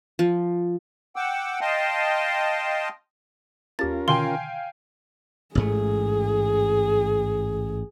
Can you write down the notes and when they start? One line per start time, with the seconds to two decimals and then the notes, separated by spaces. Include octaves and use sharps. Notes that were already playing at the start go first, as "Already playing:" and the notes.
0.19 F3
1.16 F#5 G5 D6 E6
1.61 D#5 F5 G5 A5 C6 D#6
3.79 D#2 C#4 F4 G4 A#4 A5 A6
4.08 B2 D3 D#3 F5 G5 G#5 C6
5.55 A1 G#2 A3 G#4